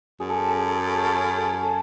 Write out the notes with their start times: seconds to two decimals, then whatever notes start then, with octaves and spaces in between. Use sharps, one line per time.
0.20 F#2 G#4
0.30 A4
0.39 G#4
0.49 A4
0.58 G#4
0.68 A4
0.77 G#4
0.87 A4
0.96 G#4
1.06 A4
1.15 G#4
1.25 A4
1.35 G#4
1.44 A4
1.54 G#4
1.63 A4